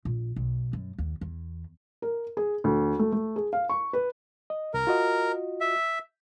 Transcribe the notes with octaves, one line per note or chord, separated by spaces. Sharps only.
A#1
B1
F#2
D#2
E2
A#4
G#4
D2
A3
A3
G#4
F5
C#6
B4
D#5
C2 A#4
F4 F#4 D#5
E5